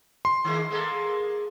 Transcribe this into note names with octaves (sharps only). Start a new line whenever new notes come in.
C6
D#3 G#3 A#3
G#3 A#3 A4